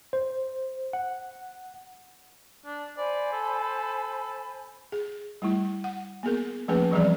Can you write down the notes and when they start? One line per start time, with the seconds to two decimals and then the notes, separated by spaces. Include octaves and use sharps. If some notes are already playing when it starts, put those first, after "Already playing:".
0.13 C5
0.93 F#5
2.65 D4
2.97 C5 D5 G#5 B5
3.33 A4
4.92 G#4
5.42 G3 A3 E4
5.84 F#5
6.23 A#3 B3 G#4 A#4
6.68 F3 A3 A#3 C#4 G#4 B4
6.91 E3 F3 G3 C4 G#4 D5